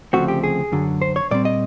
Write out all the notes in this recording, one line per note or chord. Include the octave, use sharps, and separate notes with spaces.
D2 C#3 F3 A3 C4 F#4
G4
G#4
F#2 D3 F#3
C5
C#5
A#2 G3 C4 D5
D#5